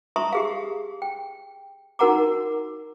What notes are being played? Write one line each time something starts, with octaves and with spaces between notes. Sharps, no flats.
E5 A5 A#5 C6 C#6 D#6
G4 G#4 F5
G5
D#4 F#4 A#4 F#5 A#5 D6